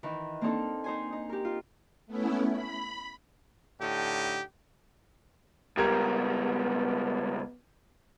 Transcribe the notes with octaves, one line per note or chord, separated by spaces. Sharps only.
D#3 E3
A#3 C4 D4 D#4 A4
D#4 C5 G#5
D#4
G4 A#4
F4
A3 B3 C#4 E4
B5
A2 D3 D#4 G4
C#2 G3 B3 G4 A#4 G#6